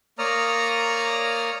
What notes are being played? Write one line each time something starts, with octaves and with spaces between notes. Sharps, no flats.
A#3 C#5 D5 A#5 D#6 F6